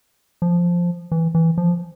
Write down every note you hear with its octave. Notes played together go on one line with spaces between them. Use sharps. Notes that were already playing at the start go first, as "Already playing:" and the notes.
F3
E3
E3
F3